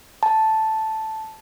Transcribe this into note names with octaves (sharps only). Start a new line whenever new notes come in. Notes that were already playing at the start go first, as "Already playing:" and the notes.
A5